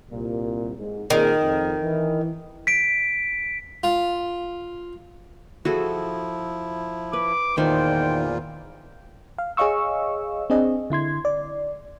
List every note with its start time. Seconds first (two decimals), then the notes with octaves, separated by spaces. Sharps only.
0.10 C2 A#2
0.77 G#2
1.10 A#2 D#3 C4 G#4
1.42 F2
1.83 E3
2.67 B6 D7
3.84 F4
5.65 F3 E4 F#4 G#4 A4
7.13 B4 D6
7.58 E2 A#2 D#3 F4 C5 G5
9.38 F5
9.57 G#4 C#5 D#5 F5 C#6 E6
10.50 C4 D4 G#4 D#5
10.90 D3 E4 C6 G#6
11.25 D5